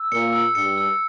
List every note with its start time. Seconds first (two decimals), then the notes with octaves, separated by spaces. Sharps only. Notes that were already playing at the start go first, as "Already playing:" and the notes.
Already playing: E6
0.11 A#2 C#7
0.33 E6
0.55 G2 C#7
0.78 E6